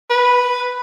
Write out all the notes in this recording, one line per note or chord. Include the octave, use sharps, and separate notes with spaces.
B4